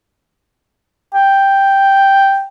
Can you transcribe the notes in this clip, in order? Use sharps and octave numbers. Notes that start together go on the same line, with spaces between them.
G5